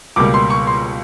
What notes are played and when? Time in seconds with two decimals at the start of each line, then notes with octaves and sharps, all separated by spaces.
0.16 C#2 B2 G3 A#3 D6
0.34 C6
0.50 C#6
0.67 C6